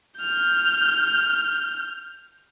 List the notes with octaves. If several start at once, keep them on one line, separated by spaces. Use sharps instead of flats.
F6 G6